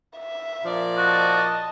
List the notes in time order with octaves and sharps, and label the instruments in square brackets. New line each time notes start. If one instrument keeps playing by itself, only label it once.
[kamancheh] E5
[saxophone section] A#2 F3 D5
[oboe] F#4 [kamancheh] D#5 A5